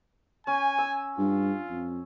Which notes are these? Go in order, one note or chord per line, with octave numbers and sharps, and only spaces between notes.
C#4 G#5
E6
G2 F4
F2